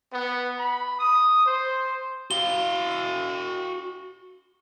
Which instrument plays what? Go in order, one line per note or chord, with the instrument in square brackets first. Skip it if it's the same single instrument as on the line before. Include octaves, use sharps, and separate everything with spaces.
[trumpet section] B3
B5
D#6
C5
[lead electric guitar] F#4 F5 [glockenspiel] G7